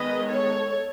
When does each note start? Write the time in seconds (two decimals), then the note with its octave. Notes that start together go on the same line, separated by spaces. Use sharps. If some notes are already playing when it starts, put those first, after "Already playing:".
Already playing: D#3 G#3 B3 B4 D#5
0.27 A4 C#5